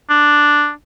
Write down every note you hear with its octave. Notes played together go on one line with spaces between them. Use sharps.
D4